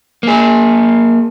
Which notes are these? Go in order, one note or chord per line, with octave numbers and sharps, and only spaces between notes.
A#3 G#4